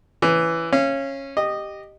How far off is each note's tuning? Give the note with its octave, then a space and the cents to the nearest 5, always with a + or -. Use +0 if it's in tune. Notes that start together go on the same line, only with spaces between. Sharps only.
E3 +10 C#4 +5
C#4 -15 F5 -35
G4 +0 D#5 -15